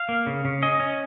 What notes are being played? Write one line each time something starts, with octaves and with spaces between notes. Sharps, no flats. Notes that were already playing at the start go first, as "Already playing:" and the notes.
Already playing: F5
A#3
C#3
C#3
C#4 D#5
C#4